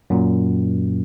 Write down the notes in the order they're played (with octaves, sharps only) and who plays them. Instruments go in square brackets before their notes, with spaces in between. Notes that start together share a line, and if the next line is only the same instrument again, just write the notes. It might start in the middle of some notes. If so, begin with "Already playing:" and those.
[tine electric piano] F#2 A#2